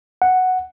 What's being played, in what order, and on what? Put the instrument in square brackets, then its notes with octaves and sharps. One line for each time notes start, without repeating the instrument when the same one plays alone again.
[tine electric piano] F#5